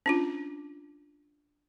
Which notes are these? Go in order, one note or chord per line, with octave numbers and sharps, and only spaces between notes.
C#4 D4 F4